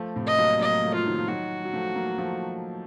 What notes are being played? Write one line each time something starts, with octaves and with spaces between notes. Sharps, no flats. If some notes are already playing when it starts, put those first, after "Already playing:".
Already playing: F3 A3
A2 C3
D#5
F#3 A#3
F#3 A#3 D#5
F3 A3
F4
D#3 F#3
F3
D#3 F#3 F#4
F#3
F3 A3
F#3 A#3
F3 A3